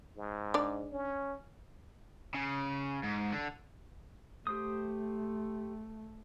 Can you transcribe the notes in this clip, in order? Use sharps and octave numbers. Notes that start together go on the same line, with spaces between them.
G#2
D4 D5
C#4
C#3
G#2
D3
A3 G4 C5 D#6